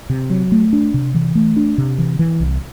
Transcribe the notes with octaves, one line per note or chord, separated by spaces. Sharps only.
C3
F#3
A3
D4
C3
E3
A3
D4
C3
E3
E3
C2